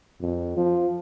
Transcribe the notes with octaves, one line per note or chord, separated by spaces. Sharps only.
F2
F3